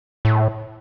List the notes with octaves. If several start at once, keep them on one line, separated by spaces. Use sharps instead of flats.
A2